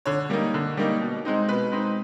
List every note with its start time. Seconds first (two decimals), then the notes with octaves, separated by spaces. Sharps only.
0.06 D3 C#5
0.30 G3 A#3 D#4
0.54 D3
0.77 G3 A#3 D#4
1.01 B2
1.25 G#3 C4 D#4
1.49 B2 B4
1.72 G#3 C4 D#4